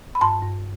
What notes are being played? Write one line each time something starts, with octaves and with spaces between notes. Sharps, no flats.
B5
G2 A5 C6
G2